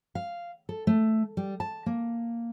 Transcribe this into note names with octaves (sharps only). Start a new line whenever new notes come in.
F5
A4
A3
G3
A5
A#3